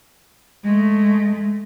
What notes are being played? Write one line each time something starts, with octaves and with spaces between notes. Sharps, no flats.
G#3 A3